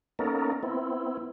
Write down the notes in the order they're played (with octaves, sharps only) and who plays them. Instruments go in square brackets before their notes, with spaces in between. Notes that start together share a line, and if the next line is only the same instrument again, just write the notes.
[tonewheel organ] A#3 B3 C#4 D#4 A4 A#4
B3 C4 E4